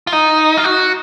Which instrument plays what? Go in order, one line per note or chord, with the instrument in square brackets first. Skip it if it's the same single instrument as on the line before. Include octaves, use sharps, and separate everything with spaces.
[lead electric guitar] F4
D#4
F4
F#4